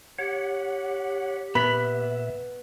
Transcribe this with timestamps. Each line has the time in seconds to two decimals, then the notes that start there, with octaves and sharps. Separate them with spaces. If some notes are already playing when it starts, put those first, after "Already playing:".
0.19 G4 C#5 F#5
1.55 A#2 B3 E5 B5